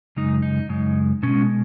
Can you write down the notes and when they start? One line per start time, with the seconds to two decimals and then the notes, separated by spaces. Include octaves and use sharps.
0.16 F#2 C#3 G#3 D#4
0.42 D#4
0.69 F#2 C#3 G#3
1.23 B2 G#3 C#4